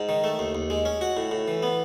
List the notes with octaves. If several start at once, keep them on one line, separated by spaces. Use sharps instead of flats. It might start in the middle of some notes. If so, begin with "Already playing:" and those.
Already playing: G#2
D#3
A3
D#2
D#2
G#3
C#4
F#4
A2
A2
E3
B3